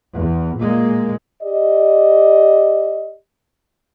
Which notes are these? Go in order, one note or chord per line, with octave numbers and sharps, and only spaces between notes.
E2
A#2 G#3 A#3
G4 D5 D#5